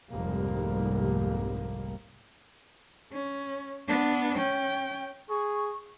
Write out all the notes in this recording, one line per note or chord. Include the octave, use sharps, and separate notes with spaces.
F1 C2 G#2 G3 A#3
C#4
B3 D4
C#4 G5
G#4 C#6